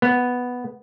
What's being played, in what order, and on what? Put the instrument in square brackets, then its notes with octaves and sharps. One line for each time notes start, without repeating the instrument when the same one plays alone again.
[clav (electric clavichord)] B3